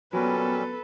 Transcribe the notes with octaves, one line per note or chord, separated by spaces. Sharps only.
A#2 F#3 G3 B3 C#4 A4 B4